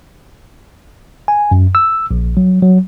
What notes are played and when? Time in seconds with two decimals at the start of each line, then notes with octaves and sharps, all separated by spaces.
1.28 G#5
1.51 F#2
1.75 E6
2.11 A#1
2.37 F#3
2.62 F#3